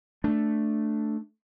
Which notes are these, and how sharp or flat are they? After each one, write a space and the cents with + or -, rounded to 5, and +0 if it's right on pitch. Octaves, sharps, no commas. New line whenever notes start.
A3 +0 D4 +0